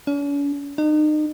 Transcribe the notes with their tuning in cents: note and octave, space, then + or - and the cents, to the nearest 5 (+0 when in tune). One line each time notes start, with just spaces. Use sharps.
C#4 +45
D#4 -35